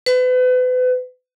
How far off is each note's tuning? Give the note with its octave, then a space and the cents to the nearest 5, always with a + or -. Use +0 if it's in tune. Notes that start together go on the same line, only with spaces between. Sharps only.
B4 +35